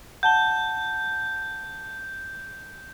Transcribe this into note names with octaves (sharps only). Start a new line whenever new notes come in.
F#5 A5 G6 G7